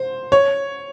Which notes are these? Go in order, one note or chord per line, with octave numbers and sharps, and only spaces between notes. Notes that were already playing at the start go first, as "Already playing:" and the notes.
Already playing: C5
C#5